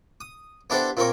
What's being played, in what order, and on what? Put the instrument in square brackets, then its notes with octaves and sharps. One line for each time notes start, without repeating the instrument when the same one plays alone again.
[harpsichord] D#6
B3 D4 E4 G4 A4 C5
A#2 C4 A#4 C#5